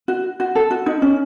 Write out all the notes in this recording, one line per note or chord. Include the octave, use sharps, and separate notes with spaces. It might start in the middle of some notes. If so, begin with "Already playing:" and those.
F#4
F#4
A4
F#4
D#4
C#4